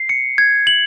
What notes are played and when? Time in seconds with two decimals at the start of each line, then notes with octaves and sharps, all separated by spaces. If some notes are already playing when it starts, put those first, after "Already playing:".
Already playing: C7
0.09 C#7
0.38 G#6
0.67 F#7